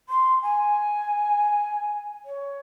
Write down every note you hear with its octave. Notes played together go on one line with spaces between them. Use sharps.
C6
G#5
C#5